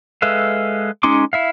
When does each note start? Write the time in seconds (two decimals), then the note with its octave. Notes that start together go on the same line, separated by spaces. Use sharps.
0.22 G#3 A4 B4 E5 F5
1.03 G#3 C#4 D#4 C6 D6
1.33 E4 E5 F5